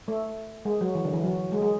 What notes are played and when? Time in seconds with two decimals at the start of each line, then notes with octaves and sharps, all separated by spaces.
0.08 A3
0.65 G#3
0.81 F#3
0.95 E3
1.05 D3
1.13 E3
1.24 F#3
1.52 G#3
1.62 G#3